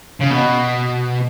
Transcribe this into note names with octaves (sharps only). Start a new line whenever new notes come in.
C#3
B2